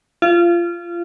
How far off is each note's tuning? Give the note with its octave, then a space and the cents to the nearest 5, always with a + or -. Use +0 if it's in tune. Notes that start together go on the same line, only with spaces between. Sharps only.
F4 -25